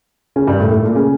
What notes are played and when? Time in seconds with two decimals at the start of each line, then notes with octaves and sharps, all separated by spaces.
0.36 C#3 C#4
0.47 G2 G3
0.60 A2 A3
0.72 A2 A3
0.83 A#2 A#3
0.95 C#3 C#4